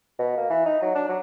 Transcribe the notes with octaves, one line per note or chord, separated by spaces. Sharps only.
B2
A#3
E3
D#4
F#3
D4
F#3